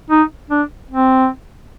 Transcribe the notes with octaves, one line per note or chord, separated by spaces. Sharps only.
D#4
D4
C4